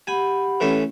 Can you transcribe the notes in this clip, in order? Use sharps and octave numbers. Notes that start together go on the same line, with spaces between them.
G4 F#5 G#5 B5
E3 A3 C#4